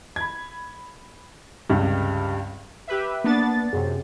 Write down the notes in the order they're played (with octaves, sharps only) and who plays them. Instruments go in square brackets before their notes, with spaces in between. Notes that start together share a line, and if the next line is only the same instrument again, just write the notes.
[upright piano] B5 G#6
C#2 G2 C3 G3
[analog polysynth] G4 B4 E5
[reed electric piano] A#3 [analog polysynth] B3 D4 A6
[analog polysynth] F#2 C3 [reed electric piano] G#4